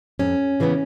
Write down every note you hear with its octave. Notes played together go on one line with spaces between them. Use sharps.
F2 C#4
C#3 E3 G3 B3